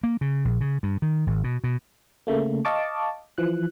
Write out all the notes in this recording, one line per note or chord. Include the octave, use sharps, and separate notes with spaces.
A#3
C#3
A#1
C#3
G2
D#3
G#1
B2
B2
C#3 A3 A#3
D#5 F5 A5 C#6 D6
E3 F3 F#6